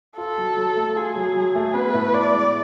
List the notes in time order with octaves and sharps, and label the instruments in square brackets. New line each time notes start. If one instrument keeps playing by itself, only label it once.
[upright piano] F4 [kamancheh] A4
[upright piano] F#3
F#3
A3
[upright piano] F4 [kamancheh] G#4
[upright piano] F#3
F#3
A3
[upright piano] B3 [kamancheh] B4
[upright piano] A2
[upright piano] A2 [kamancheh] D5
[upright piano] G#3